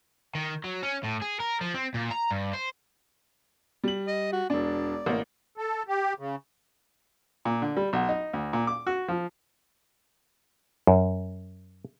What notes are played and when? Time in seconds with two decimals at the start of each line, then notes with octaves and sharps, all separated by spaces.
0.35 D#3
0.64 F#3
0.83 C#4
1.04 A2
1.22 G#4
1.40 A#4
1.61 F3
1.74 C4
1.94 A#2
2.11 A#5
2.31 G2
2.53 C5
3.84 G3 F#7
4.07 D#5
4.33 F#4
4.50 E1 D4 D5
5.06 A1 A#3
5.57 A4
5.88 G4
6.19 C#3
7.45 A#2
7.62 D3
7.77 G3
7.93 B1
8.09 D#4
8.33 D2
8.53 A#2
8.67 D6
8.87 F#4
9.08 F3
10.87 F#2